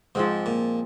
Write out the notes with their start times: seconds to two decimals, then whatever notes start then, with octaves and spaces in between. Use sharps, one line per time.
0.15 G#2 F3 G#3 C4
0.46 A#2